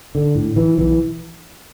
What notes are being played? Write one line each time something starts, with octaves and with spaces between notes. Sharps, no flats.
D3
A2
E3
B1 E3